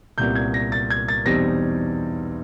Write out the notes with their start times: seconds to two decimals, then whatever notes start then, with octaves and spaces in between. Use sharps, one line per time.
0.18 C2 A#2 G3 B3 G6
0.35 G#6
0.54 A#6
0.72 A6
0.90 G#6
1.08 A6
1.25 E2 B2 G3 C4 D#4 A#6